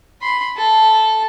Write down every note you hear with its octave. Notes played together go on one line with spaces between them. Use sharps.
B5 C6
A4